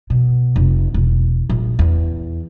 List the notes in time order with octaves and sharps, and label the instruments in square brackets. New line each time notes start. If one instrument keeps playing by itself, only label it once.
[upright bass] B2
F1
E1
A#1
E2